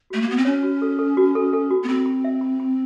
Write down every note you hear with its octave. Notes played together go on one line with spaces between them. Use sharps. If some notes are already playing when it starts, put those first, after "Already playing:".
A3 F#4
A#3
B3 F#4
C4
C#4 C#5
F#4
A4
A4
F#4
A4
A4
F#4
B3
C4 B5
B5
E5
B5
B5